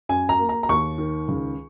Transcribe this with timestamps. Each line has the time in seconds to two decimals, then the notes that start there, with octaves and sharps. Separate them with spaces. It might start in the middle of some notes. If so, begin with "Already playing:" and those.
0.09 F#2 G#5
0.29 A#5
0.39 A#3
0.49 A#5
0.63 A#5
0.69 D#2 C#6
0.98 D#3
1.28 C#2